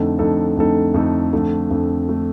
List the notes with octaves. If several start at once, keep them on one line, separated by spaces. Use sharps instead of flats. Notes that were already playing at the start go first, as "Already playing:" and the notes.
Already playing: F2 D3 A3 D#4 A4
F2 D3 A3 D#4 A4
F2 D3 A3 D#4 A4
F2 D3 A3 D#4 A4
F2 D3 A3
F2 D3 A3
D3 A3